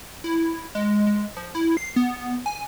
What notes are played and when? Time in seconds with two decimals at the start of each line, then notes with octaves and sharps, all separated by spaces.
0.24 E4
0.75 G#3
1.06 G#3
1.37 F3
1.55 E4
1.77 C7
1.96 B3
2.46 G#5